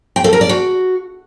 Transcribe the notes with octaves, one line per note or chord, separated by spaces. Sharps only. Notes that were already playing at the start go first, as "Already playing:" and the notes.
G5
A4
A#4
D5
F#4